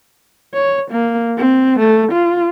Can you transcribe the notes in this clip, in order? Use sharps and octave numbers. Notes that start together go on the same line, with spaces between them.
C#5
A#3
C4
A3
F4